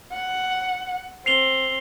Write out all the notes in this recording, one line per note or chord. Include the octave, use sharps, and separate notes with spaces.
F#5
C4 C7 F7 G7